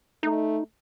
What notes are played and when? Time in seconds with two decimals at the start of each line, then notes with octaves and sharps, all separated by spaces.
0.23 A3 D#4